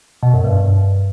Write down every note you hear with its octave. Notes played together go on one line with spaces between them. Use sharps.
B2
F#2
G2